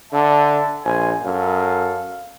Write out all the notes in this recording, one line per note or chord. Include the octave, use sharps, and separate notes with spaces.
D3 E5 A5
A#1 C5 G#5
F#2 A4 F5